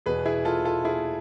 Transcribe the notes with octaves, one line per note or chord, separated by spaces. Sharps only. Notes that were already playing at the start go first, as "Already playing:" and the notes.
E2 B2 G#4 B4
E4 G#4
F4 A4
F4 A4
E4 G#4